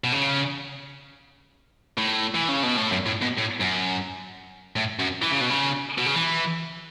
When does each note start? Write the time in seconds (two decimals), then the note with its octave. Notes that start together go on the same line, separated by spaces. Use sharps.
0.04 B2
0.12 C#3
1.98 A2
2.35 E3
2.49 C#3
2.63 B2
2.77 A2
2.91 F#2
3.06 A2
3.22 B2
3.37 A2
3.60 F#2
4.76 A2
4.99 F#2
5.22 E3
5.32 C#3
5.41 B2
5.50 C#3
5.98 B2
6.06 C#3
6.15 E3